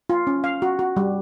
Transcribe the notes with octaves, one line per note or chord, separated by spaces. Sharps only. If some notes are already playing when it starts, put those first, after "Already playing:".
F4
C#4
F5
F#4
F#4
G3